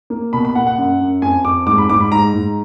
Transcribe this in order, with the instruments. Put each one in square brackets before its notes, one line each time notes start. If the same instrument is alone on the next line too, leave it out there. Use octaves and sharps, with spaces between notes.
[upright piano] A#3
B2 B5
B5
A#3 F#5
F#5
F#2
F#2
F2 G#5
F2 D6
G#2 D6
B5
G#2 D6
B5
G#2 A#5
G#2